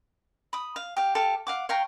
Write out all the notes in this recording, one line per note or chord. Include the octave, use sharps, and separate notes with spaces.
B5 D#6
F5
G4 F5
G4 A4 F5
F5 F#5 D6
C#5 F5 G5 A#5